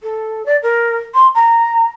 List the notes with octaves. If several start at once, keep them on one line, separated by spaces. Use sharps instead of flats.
A4
D5
A#4
C6
A#5